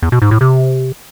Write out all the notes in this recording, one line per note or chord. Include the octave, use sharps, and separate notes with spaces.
E2
B2
G#2
A2
C3